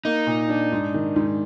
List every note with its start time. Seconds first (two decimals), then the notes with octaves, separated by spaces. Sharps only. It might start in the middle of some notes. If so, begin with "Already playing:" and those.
0.05 A#3 D#4
0.27 A#2
0.49 D4
0.72 G#2
0.94 D#3
1.16 G#2